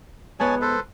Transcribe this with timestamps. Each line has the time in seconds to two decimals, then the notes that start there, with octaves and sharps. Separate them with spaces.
0.40 G#2 B3 C#5 G#5 A5
0.61 A4 B4 C5